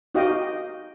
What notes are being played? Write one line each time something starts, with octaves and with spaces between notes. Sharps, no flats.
D#4 F#4 G4 D#5 F5 G5